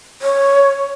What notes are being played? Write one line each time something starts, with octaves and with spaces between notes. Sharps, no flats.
C#5